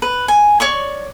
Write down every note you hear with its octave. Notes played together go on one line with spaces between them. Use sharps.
B4
G#5
C#5 D5 C#6